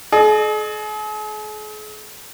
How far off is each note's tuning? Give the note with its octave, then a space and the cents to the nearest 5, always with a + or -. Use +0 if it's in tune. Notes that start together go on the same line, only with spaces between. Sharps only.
G#4 +45 D#5 -40 D#6 +0